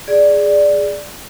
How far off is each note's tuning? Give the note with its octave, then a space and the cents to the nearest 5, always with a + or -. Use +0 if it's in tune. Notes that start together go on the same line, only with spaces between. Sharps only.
G#4 +0 D5 +0